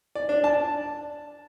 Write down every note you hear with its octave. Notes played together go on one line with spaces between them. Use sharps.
D5
D4
A5